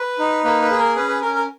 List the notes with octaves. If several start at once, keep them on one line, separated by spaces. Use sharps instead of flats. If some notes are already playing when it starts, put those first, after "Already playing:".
Already playing: B4
D#4
A#3 B4
B4
G#4
A#4
C#4 B4
B4
C#4 A#4
A#4